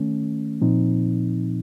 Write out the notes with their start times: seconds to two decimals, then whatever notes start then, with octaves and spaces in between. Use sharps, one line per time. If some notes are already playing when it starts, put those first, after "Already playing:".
Already playing: D#3 A3 C#4
0.61 A#2 F3 C4 D#4